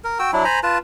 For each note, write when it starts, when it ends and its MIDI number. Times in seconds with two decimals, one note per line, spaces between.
0.04 0.18 70
0.19 0.31 66
0.19 0.31 79
0.19 0.31 88
0.33 0.44 54
0.33 0.44 62
0.33 0.44 64
0.45 0.60 72
0.45 0.60 80
0.45 0.60 82
0.45 0.60 83
0.63 0.78 65
0.63 0.78 71
0.63 0.78 81